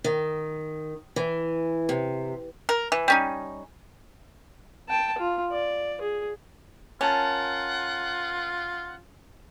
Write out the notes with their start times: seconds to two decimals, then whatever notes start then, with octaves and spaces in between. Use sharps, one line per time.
0.04 D#3
1.16 E3
1.89 C3
2.69 A#4
2.92 E3
3.08 G3 C#4 D#4
4.89 G5 A5
5.18 F4
5.52 D5
6.01 G#4
7.01 C#4 F4 A#4 F#5 A5